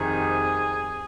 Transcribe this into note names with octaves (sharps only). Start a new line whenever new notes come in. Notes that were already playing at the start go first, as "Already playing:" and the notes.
Already playing: F2 C3 D#3 G#4